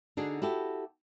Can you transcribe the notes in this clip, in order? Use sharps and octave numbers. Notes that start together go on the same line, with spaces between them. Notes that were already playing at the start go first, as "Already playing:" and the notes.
D3 D4 D#4 F#4 G#4
E4 F#4 G4 A4